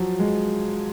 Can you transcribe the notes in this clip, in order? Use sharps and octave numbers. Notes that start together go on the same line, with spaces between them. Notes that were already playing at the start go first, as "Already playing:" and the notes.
Already playing: F3 F#3
G#3